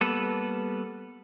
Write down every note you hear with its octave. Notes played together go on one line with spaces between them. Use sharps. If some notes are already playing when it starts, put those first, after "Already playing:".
G3 A#3 B3 A4 B4